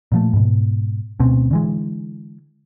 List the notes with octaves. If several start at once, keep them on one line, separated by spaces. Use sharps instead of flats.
A#2 F3 A3
G#2 B2
D2 B2 C4 C#4
D3 E3 G#3